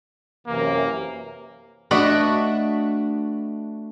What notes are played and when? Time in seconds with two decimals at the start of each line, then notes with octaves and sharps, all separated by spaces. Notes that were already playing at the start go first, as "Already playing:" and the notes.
0.47 F#2 C3 E3 A#3
1.91 A3 D4 F#4 B4 D5 D#5